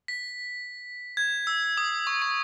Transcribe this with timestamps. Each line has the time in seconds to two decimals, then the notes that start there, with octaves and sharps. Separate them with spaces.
0.08 B6
1.17 G#6
1.47 E6
1.77 D#6
2.07 C#6
2.22 C#6